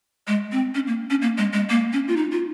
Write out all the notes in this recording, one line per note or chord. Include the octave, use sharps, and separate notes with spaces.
G#3
C4
C#4
A#3
C#4
A#3
G#3
G#3
A#3
C#4
F4
D#4
F4